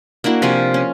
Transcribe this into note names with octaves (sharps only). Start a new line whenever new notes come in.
A#3 D4 E4 F#4
C3 F3 F4 G#5
C#4